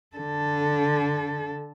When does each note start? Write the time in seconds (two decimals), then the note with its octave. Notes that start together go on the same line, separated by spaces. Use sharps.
0.16 D3 A4